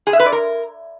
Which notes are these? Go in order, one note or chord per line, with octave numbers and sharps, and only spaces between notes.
G#4
E5
B4
D5
A#4